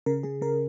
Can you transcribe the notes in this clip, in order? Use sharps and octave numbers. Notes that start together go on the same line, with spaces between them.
C#3 A#4
C#3 G#4
C#3 A#4